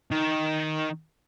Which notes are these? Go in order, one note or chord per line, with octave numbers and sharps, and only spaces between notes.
D#3